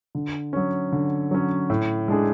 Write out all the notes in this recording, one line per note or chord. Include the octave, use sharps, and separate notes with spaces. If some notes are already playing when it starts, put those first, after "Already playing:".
D3
F#3 C#4
D3
F#3 C#4
A2
G#3 D4 G#4